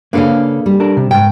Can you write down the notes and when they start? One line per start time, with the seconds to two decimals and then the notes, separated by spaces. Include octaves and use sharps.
0.13 C#3 A#3 D4 A4 B4 F5
0.66 G3
0.80 D4 A4 A#4
0.97 C3
1.11 G#2 G5